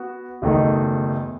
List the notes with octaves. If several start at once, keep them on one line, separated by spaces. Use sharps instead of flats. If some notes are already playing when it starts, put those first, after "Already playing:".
Already playing: B3 F#4
F#1 E2 D#3 A3 D#4